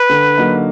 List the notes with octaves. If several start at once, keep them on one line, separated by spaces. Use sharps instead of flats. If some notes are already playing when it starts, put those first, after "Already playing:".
Already playing: B4
D3
F#3 A#3 D#4